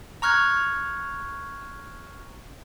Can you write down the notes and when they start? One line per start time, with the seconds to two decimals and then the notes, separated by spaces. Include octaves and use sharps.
0.22 A#5 C#6 F6 F#6 G#6